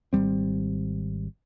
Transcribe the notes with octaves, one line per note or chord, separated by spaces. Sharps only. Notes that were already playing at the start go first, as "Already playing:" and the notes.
G#1 E2 G3 C4